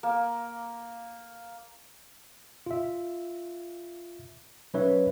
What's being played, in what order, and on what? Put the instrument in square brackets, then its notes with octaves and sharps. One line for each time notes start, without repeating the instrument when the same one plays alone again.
[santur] A#3
[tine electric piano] F4 E5
F#3 C#4 D#4 B4 C#5 E5